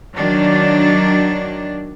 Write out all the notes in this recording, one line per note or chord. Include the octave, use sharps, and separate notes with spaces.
D#3 F#3 D4